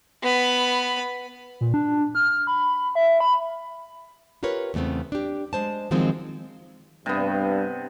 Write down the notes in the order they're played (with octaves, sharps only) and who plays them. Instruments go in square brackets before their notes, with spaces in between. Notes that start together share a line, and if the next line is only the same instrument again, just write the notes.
[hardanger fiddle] B3 B5
[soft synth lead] A#2
D4
F6
B5
E5
B5
[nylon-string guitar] F4 G4 A#4 B4 C#5
E2 C#3 A3 B3 C4
D4 G4
G#3 C5 A5
D#3 F3 F#3 G#3 C4 D#4
[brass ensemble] G2 [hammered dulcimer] C3 B3